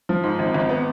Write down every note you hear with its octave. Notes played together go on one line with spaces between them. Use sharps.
F3
G#2
G#1
G#1
B3